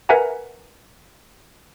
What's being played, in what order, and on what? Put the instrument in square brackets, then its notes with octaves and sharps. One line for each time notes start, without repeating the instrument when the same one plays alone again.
[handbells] A#4 B4 E5 F#5 G#5 A#5